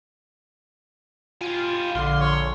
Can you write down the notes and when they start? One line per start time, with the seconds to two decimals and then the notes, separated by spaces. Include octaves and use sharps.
1.41 G3 F4 G#5
1.95 A#1 D3 F5 C6
2.20 C#5